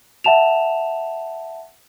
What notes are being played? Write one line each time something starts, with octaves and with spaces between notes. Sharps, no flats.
E5 F#5 A5 E7 F7